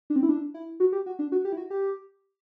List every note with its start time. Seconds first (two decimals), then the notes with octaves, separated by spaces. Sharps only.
0.10 D4
0.16 C4
0.23 E4
0.29 D4
0.54 E4
0.80 F#4
0.92 G4
1.06 F#4
1.19 D4
1.32 F#4
1.45 G4
1.53 E4
1.57 F#4
1.70 G4